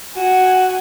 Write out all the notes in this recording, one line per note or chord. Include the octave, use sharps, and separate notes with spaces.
F#4 F#5 G#5